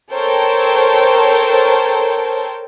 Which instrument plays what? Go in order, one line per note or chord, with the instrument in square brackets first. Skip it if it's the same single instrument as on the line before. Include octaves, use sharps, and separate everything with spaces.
[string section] A4 A#4 C5 C#5 G5 A5